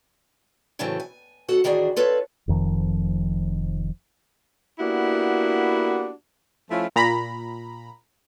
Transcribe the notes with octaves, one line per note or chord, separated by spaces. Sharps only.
A2 C#3 E3 F#3 A3 C4
G#5
D#2 F#4 A4 F#5
A2 D#3 E3 D4 F#4 G#4
F4 A4 B4 C#5
F1 F2 D#3 F3
A#3 B3 D4 E4 F#4 G4
F3 A3 C#4 E4 F4
A#2 A#5 B5